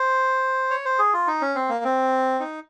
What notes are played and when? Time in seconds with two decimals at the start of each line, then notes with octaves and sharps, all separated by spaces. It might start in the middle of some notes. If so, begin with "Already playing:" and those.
Already playing: C5
0.70 C#5
0.85 C5
0.99 G#4
1.13 F4
1.27 D#4
1.42 C#4
1.55 C4
1.69 A#3
1.84 C4
2.40 D#4